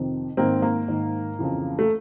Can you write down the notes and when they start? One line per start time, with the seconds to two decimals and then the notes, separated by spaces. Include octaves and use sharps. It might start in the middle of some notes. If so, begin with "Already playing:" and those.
Already playing: F2 C3 D#3
0.37 G#2 D#3 A#3 C4
0.62 A#3
0.88 G#2 D#3
1.39 F2 C#3 E3
1.79 A3